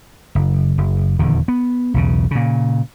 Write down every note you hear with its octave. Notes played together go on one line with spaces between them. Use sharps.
F#1
F#1
D#1 E2 D3 D#3
B3
B1 E2 C#3
A#2 C#3